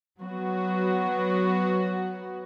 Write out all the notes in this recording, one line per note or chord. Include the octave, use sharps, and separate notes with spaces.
F#3 B3 F#4